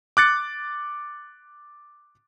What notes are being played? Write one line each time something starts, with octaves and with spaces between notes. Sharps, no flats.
D6 F#6 A6 C#7